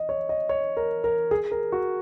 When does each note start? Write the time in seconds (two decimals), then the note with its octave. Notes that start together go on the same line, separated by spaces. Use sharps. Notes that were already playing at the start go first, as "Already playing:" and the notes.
Already playing: D#5
0.09 C#5
0.29 D#5
0.49 C#5
0.77 A#4
1.04 A#4
1.31 G#4
1.51 A#4
1.72 F#4